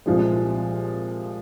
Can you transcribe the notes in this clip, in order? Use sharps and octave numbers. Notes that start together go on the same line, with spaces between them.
C2 A#2 F3 G#3